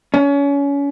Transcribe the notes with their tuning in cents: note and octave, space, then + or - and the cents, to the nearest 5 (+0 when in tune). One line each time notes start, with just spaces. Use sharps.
C#4 +30